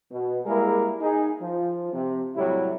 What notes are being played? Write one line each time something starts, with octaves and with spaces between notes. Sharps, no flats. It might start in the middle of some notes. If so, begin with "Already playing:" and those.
B2
G3 G#3 A#3 E4 G#4 A#4
D#4 G#4
F3
C3
A2 C3 F#3 G3 C4 E4